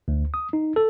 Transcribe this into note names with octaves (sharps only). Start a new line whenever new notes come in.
D2
D#6
D#4
A4